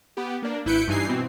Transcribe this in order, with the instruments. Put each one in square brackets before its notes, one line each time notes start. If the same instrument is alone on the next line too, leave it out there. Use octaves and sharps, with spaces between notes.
[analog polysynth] B3 G4
A#3 D4
G#1 E4 B4 G6 C#7 D7
G2 E3 D#4 G#5 C7
B2 E3 C4